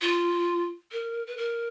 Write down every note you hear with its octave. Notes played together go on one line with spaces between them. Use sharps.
F4
A#4
B4
A#4